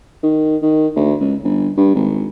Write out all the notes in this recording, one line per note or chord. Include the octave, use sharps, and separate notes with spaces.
D#3
D#3
D2
C#2
G1
G2
G#1